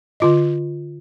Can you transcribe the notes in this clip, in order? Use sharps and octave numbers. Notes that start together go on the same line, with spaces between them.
D3 F4 D#5